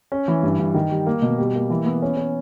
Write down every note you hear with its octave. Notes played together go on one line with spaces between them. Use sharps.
C#4
E3
G2
G2
D#3
G3
A#3
B2
G3
A#3
E3
B3
C#4
C#4